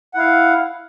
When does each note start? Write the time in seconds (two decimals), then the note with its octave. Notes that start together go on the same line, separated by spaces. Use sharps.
0.14 F#5
0.17 E4
0.19 F5